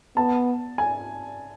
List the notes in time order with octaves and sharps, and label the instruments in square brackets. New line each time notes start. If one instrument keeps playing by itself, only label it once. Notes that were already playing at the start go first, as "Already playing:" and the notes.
[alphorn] B3 [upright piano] A5
[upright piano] G#5